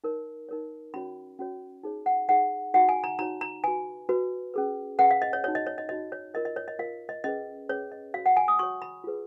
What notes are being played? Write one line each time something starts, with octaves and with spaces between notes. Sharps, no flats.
D#4 A#4 C#5
D#4 A#4 C#5
C#4 F#4 C#5 B5
C#4 F#4 C#5
D#4 G#4 C#5
F#5
D#4 G#4 C#5 F#5
D#4 F#4 C#5 F#5
G#5
A#5
D#4 F#4 C#5 A#5
A#5
F#4 B4 G#5
F#4 B4
C#4 G#4 B4
C#4 G#4 B4 F#5
F5
D#5
C#5
D#4 F#4 C#5
D#5
C#5
D#5
D#4 F#4 C#5 D#5
C#5
F4 A#4 C#5 D#5
D#5
C#5
D#5
F4 A#4 C#5 F5
D#5
C#4 G#4 B4 D#5
C#4 G#4 B4 C#5
D#5
F#4 C#5 F5
F#5
G#5
D#6
F#4 C#5 C#6
B5
F4 G#4 B4